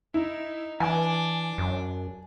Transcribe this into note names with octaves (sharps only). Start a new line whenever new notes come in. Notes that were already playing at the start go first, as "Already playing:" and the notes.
D#4 E4
E3 D4 G#5 D6
F#2